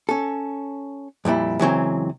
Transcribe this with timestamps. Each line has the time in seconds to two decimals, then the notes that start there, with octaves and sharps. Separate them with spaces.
0.09 C#4 A4
1.25 F2 A#2 G3 E4
1.59 C#2 E3 F#3 C4